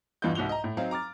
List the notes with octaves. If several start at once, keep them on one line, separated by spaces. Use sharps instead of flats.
E2 G2 E3 F4 D#5 G6
C2 G#2 F#4 F7 G7
D#5 A#5
A2
F#3 C4 D#4 F5
A#5 D6 F6 A6